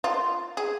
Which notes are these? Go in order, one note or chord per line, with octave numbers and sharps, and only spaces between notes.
F4
G#4